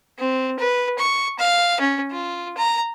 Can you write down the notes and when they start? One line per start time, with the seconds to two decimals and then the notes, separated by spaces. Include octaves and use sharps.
0.18 C4
0.59 B4
0.99 C#6
1.39 F5
1.80 C#4
2.12 F4
2.57 A#5